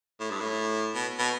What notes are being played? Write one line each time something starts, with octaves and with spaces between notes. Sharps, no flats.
A2
G2
A2
B2
B2